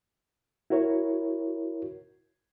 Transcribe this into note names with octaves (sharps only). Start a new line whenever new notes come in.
E4 F#4 A#4 C#5